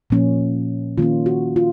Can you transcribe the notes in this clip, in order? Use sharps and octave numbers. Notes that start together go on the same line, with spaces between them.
A#2 F3 A#3 C#4
D#3 A#3 C#4 F4
F#4
F4